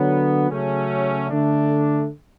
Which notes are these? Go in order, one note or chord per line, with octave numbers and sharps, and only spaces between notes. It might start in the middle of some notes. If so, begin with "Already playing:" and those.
Already playing: D3 F#3 B3
C#3 F#3 A3 C#4
D3 A3 D4